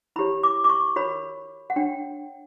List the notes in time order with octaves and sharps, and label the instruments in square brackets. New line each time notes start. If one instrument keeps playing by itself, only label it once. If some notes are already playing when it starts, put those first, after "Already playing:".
[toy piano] E4 G4 C#5 B5
D6
D6
C#6
F#4 A#4 C#5 B5
F#5
D4 F#4 C#5 G5